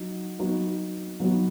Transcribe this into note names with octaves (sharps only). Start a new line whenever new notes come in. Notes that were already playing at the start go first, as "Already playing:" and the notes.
Already playing: F#3 D#4 F#4
F#3 B3 D#4 F#4
F#3 B3 D#4 F#4